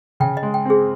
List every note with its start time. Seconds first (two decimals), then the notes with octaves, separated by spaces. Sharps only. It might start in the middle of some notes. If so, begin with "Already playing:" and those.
0.20 C#3 G5
0.37 D#5
0.43 G#3
0.54 G5
0.65 C4 G#4